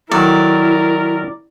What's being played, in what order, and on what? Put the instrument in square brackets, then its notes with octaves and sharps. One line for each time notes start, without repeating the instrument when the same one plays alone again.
[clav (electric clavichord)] D#3 F#3 A4 [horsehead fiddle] E4 [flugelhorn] A#4 [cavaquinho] D5